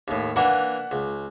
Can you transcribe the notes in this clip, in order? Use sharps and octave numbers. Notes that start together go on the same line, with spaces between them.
D#2 A2
E3 A#3 D4 F#5
C#2